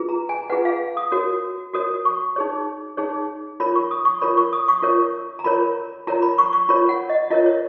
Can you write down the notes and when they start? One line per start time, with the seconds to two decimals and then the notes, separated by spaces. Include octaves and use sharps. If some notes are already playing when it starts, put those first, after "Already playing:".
Already playing: F4 G#4 B4
0.09 A#5
0.29 G#5
0.50 F4 G#4 B4 F#5
0.65 F5
0.97 D#6
1.12 F#4 A#4 C#5
1.73 F#4 A#4 C#5 D#6
2.05 C#6
2.36 D#4 G#4 C#5
2.97 D#4 G#4 C#5
3.60 F4 A#4 C#5 B5
3.75 C#6
3.91 D#6
4.05 C#6
4.21 F4 A#4 C#5 B5
4.37 C#6
4.53 D#6
4.68 C#6
4.83 F4 A#4 C#5
5.39 A#5
5.44 F4 A#4 C#5 B5
6.07 F4 A#4 C#5 A#5
6.22 B5
6.38 C#6
6.53 C#6
6.69 F4 A#4 C#5 B5
6.89 F#5
7.09 D#5
7.30 F4 A#4 C#5 D#5
7.46 C#5